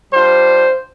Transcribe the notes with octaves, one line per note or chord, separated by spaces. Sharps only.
G3 D4 F4 C5